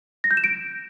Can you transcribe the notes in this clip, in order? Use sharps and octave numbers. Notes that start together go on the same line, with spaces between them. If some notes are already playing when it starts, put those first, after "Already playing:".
A#6
G6
E7
D7